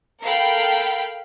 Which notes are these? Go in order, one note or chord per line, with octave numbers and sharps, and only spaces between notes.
A4 A#4 F5 G5 B5